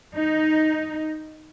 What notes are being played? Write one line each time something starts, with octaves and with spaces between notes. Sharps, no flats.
D#4